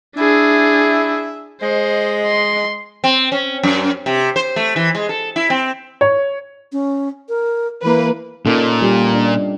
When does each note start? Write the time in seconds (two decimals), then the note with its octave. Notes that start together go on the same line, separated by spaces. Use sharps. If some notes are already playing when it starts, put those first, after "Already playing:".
0.17 D4 E4 G#4 E5
1.61 G#3 C5 D#5
2.26 C6
3.04 C4
3.32 C#4
3.63 F#2
4.06 C3
4.36 C5
4.56 A3
4.76 E3
4.95 G#3
5.09 A4
5.36 E4
5.50 C4
6.01 C#5
6.72 C#4
7.29 A#4
7.83 E3 A#3 B4
8.46 A#2 C#4 D#4 A4
8.82 G3 F4 G4
9.12 D4 D#5